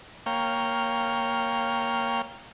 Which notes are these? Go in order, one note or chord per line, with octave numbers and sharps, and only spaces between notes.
A#3 C#5 F5 G5